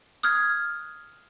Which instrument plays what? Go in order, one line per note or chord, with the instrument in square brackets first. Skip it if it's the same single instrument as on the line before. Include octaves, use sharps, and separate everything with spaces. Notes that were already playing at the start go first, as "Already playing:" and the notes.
[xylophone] D#6 F6 F#6 G#6